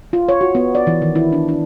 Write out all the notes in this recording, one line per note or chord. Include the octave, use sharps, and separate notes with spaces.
F4
C#5
F#4
B3
D5
E3
D#3
E4
D4
D4